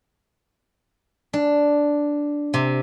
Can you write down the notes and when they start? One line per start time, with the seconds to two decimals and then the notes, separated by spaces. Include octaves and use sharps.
1.33 D4
2.54 C3